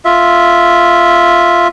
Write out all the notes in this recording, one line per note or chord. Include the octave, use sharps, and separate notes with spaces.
F4 E5